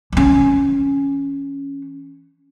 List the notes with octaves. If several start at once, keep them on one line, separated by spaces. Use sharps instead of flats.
E3 C#4